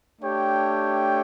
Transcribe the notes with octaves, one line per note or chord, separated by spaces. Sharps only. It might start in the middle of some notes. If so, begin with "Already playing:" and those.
A3 D4 G4 C#5 G5